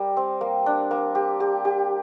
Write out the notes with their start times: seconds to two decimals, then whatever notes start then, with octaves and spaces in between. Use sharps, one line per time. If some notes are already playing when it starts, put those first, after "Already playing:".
Already playing: G3 G4 A#4
0.17 C4
0.41 A#3
0.66 D4
0.91 A#3
1.15 G4
1.40 G4
1.65 G4